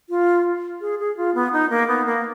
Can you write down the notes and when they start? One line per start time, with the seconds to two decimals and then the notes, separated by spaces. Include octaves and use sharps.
0.09 F4
0.81 G#4
0.99 G#4
1.17 F4
1.35 B3
1.53 D#4
1.70 A#3
1.88 B3
2.06 A#3